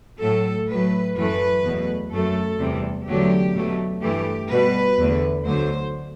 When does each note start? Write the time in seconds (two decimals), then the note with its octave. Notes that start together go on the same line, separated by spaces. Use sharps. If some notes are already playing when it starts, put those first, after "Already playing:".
0.21 A2 F#3 A3 A4
0.69 A2 F#3 A3 B4
1.17 F#2 E3 A3 B4
1.64 E2 B2 F#3 A3
2.12 F#2 F#3 A3 A4
2.59 E2 C3 G3
3.07 E2 D3 F#3 A3 G4
3.55 B2 F#3 A3
4.02 G2 E3 A3 G4
4.50 B2 G3 B4
4.98 E2 D3 A3
5.46 D2 D3 F#3 C5